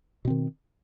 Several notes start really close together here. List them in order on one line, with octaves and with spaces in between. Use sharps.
B2 C4 D#3